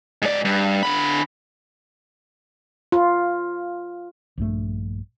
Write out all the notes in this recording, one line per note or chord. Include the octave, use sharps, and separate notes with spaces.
G#2 D5
G2
D3 B5
F4
A#1 G2 A3